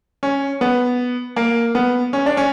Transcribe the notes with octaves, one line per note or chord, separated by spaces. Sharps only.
C#4
B3
A#3
B3
C#4
D4
C#4